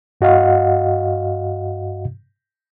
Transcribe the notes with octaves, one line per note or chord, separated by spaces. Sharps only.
G2 F#4 D#5 F5 F#5